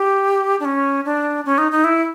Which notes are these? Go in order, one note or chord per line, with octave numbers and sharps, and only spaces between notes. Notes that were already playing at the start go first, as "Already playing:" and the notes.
Already playing: G4
D4
C#4
D4
C#4
D#4
D#4
E4